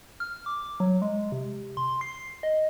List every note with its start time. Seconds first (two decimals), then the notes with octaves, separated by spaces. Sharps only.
0.20 F6
0.46 D6
0.80 F#3
1.02 G#3
1.32 C3
1.77 C6
2.01 C7
2.43 D#5